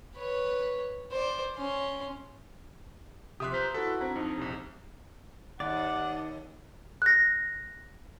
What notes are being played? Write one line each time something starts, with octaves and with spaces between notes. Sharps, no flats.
B4 C#5
C5 D5
C#4 C6
C3 F3 G4 E5 C6 D#6 F#6
F4 B4 C5 A#5
E4 F#4 A4 B4
C4 D4 E4 A#5
F2 D#4
A#1 F2 C3
D#2 D5 F#5
F#6 A#6